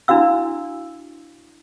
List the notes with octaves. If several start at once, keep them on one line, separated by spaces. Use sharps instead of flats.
D4 E4 F#4 F5 E6